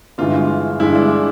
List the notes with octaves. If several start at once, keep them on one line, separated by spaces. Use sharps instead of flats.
G1 G2 E3 G#3 F4
G1 G2 E3 G#3 E4
D4